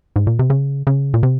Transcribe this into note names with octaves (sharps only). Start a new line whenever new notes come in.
G#2
A#2
C3
C#3
C#3
A#2
C3